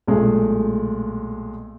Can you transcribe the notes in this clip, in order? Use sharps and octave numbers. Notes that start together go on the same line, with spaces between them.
B1 A#2 G#3 A3